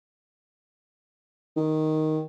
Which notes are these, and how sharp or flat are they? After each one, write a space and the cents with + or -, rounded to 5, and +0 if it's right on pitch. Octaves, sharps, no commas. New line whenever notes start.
D#3 +5